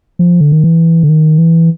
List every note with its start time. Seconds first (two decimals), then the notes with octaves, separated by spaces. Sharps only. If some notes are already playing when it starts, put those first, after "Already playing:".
0.19 F3
0.41 D3
0.52 D#3
0.64 E3
1.03 D3
1.09 D#3
1.38 E3